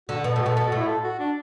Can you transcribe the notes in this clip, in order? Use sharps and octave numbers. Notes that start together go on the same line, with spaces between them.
D3 F#4
B2
A4
A2
F#4
B2 A4
B2 A4
F#4
A2
E4
A4
F#4
D4